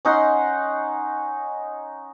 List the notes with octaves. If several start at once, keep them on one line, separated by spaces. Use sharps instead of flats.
C#4 D#4 F#5 C6